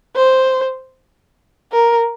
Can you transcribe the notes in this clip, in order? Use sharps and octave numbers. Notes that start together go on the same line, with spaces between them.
C5
A#4